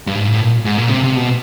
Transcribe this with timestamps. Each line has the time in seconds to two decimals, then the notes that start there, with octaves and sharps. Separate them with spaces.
0.07 G2
0.15 G#2
0.27 A2
0.40 A#2
0.65 G#2
0.78 A#2
0.87 C#3
0.91 C3
1.04 C3
1.16 B2